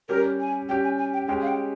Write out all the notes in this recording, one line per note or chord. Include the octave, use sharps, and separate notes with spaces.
G3 C#4 G4 A#4
G#5
G3 C#4 G4 G5
G#5
G#5
G5
G#3 C#4 G4 G5
F5
G5